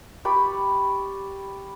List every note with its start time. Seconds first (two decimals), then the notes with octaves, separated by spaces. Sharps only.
0.25 G4 D5 B5 C#6